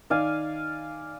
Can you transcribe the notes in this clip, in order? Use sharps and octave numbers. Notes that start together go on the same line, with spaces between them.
D#3 D#4 D5 F5 G#5